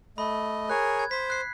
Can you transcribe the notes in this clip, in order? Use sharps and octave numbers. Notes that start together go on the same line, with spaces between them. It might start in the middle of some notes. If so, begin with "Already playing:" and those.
A3 D#5 B5
G#4 A#4 C#5 F#6
G#6
C5 B6
F#6 C7